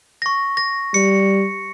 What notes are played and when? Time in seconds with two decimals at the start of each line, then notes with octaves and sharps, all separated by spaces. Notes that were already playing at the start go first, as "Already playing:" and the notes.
0.22 C#6 A#6
0.57 A#6
0.94 G3 C#7